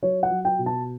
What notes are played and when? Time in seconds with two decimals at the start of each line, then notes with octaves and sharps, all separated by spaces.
0.02 F#3 C#5
0.23 F#5
0.30 F#3
0.45 G5
0.59 B2
0.66 A5